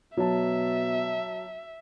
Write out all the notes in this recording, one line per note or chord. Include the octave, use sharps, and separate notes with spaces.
B2 F#3 E5 A5